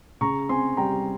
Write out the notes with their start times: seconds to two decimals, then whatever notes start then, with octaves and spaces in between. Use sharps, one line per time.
0.21 C#3 A#5 C#6
0.49 C4 G#5 C6
0.77 G3 G5 A#5